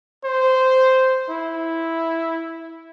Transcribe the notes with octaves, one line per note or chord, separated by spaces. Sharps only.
C5
E4